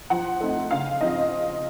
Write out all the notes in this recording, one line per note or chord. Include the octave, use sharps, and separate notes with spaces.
F3 F#5
A3 C4 D#4
C#3 F5
F3 C4 D#4 D#5